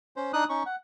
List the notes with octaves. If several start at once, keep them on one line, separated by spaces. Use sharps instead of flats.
C#4 C5
D4 D#4 D#6 F#6
C#4 D#4 C#6
F#5